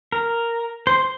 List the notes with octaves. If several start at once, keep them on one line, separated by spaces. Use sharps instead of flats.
A#4
C5